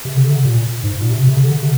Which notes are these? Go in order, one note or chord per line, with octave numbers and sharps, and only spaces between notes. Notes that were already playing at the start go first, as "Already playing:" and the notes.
C3
D3
C3
A#2
G#2
A#2
C3
C3
D3
D3
C3